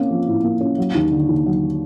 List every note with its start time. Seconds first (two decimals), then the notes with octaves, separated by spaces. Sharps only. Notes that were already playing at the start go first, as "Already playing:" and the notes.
Already playing: A#3 C4 C#4
0.10 F3
0.27 A2
0.44 A#3
0.61 C#4
0.78 F#3
0.95 D#2
1.11 D3
1.28 D#2
1.46 F#3